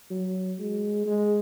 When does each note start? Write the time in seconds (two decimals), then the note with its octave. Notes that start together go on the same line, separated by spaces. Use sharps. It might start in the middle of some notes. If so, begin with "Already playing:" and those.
0.10 F#3
0.59 G#3
1.06 G#3